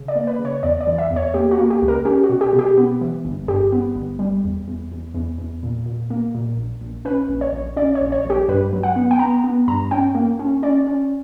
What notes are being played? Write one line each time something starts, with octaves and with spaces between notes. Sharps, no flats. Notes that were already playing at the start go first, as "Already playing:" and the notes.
Already playing: C#3
D5
A#3
B4
C#3
C#5
E2 D5
D5
E3
E5
E2
C#5
A#3 G4
F#4
A#3
G4
C#2
A#4
C#4 G4
F#4
B2
G4
B2
G4
B3
E3
G1
G2 G4
B3
G1
G3
E2
E2
E2
E2
E2
A#2
A#2
A#3
A#2
A#1
A#1
C#4 B4
A#1
C#5
A#1
C#4 D5
C#5
A#1
C#5
A#1 G4
G2 B4
F#3
F#5
B3
G5
B3 A#5
B3
G2 A#5
C#4 G5
A#3
C#4
C#4 D5
C#4